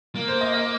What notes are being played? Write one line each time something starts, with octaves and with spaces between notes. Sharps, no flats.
A#3
C5
D#5
D#5